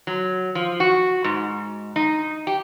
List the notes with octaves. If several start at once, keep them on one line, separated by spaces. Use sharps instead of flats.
F#3
F3
F#4
G#2
D#4
G4